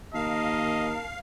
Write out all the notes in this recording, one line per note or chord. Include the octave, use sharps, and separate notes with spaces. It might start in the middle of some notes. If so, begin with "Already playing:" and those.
D#2 A#4 D#5 F5 A5